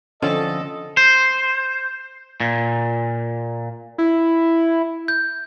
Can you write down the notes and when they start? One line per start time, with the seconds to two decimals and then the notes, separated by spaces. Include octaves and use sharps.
0.22 D3 F3 C4 C#4 A4 D#5
0.97 C5
2.40 A#2
3.98 E4
5.08 G6